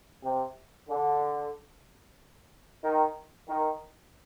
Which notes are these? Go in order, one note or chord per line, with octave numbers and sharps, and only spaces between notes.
C3
D3
D#3
D#3